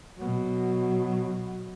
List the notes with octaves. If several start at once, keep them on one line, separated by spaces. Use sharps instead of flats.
B2 F#3